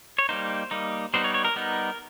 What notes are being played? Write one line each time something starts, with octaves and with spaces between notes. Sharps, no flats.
C#5
G3 A#3 D#4 C5
G3 A#3 D#4
G3 B3 D#4 C5
C#5
C#5
A#4
G3 B3 D#4